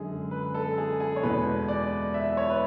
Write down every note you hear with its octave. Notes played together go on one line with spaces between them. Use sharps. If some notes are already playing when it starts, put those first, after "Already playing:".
Already playing: F#2 D3 G#3 G#4
B4
A4
G#4
G#4
C#5
E2 B2 G#3 B4
D5
E5
C#5
B4